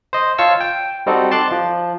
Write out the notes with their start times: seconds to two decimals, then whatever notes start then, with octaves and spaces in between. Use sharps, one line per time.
0.13 C5 D#5
0.38 F4 C#5 F5 A5 C#6 E6
0.60 G5
1.07 G3 C4 D#4 F#4 A4
1.31 A5 C6 D6 F#6
1.52 F3